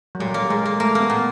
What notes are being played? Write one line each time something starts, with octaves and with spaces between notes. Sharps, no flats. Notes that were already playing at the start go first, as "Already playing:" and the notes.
F#3
A#2 G3
A#3
A#2 G#3
A#3
A3 A#3
A#3
B3
A#2